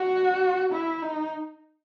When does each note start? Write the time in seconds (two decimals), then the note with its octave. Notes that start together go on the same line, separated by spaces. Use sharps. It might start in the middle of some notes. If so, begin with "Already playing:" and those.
Already playing: F#4
0.72 E4
1.02 D#4